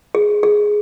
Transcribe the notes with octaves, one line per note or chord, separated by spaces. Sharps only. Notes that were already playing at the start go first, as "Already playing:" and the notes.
G#4
G#4